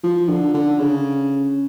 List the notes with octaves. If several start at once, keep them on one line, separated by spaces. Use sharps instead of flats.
F3
D3
D3
C#3